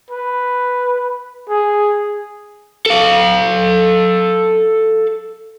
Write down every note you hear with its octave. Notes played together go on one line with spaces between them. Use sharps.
B4
G#4
A4 F5